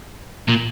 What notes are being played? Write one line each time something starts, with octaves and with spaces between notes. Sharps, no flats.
A#2